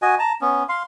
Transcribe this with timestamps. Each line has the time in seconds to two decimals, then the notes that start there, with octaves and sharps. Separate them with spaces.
0.02 F#4 D#5 G#5
0.19 A5 A#5
0.41 B3 C#4
0.69 F5 C6